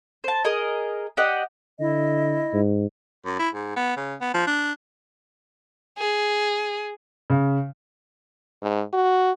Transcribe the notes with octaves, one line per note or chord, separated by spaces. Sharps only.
C5 A5
G#4 A#4 D#5
G4 D5 D#5 F#5
D3 E4 D#5
G#2
F#2
E4
G#2
B3
C#3
B3
F3
D4
G#4
C#3
G#2
F#4